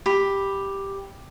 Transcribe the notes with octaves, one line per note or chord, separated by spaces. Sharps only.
G4 B5